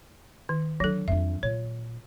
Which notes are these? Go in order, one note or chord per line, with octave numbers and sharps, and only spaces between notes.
D#3
D3 F#3 D4 A4
F2 D4 E5
A#2 C#5